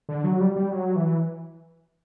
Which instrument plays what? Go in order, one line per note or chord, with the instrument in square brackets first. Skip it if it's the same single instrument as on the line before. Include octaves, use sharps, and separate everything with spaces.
[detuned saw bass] D3
F#3
G3
G3
F#3
E3